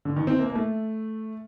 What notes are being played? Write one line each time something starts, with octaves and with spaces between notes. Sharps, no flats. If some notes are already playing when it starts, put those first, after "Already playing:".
D3
D#3
C4
A#3
A#3
A3